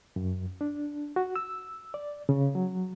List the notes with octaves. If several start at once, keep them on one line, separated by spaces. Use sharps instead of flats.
F#2
D4
F#4
E6
D5
C#3
F#3